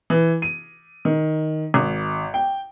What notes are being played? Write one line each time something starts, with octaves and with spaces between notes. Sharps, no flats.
E3
D#7
D#3
G#1
G5